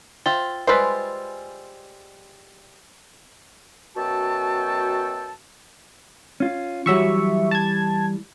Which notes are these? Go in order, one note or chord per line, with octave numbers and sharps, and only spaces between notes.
F4 C5 E5 G5 A6 G7
G3 G#3 F4 B4 C5 G#5 E6 A6
F#2 B2 F#4 A4 G5 A5
C#4 F4
E3 F#3 G3 E5 C#6
A5 G#6